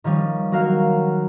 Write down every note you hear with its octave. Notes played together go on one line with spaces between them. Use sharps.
D#3 F3 G3 C#4
F#3 A#3 F#4 A#4 F5